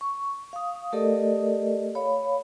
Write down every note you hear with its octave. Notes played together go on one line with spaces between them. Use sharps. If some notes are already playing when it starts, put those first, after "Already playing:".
C#6
F5 D#6
A3 G4 A4 A#4 D5 D#5
C#5 F5 B5